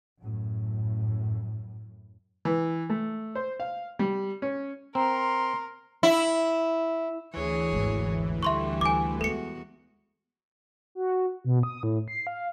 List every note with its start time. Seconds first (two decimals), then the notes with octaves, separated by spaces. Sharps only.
0.23 F#2 A2
2.45 E3
2.90 A3
3.35 C5
3.60 F5
3.99 G3
4.42 C#4
4.95 C4 A#4 A#5 C6
6.03 E4
7.34 D2 E3 G#4 C#5
7.73 G#1 E2
8.43 D3 G3 A3 E5 C6 C#6
8.81 E4 G#5 D6
9.21 E2 G#3 B3 F#4 A4 C#7
10.95 F#4
11.45 B2
11.63 D#6
11.83 A2
12.08 C7
12.27 F5